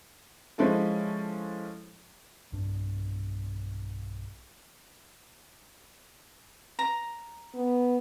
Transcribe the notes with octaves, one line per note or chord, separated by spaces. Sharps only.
F3 G#3 C#4 E4 A4
B1 G2 D4
A#5
B3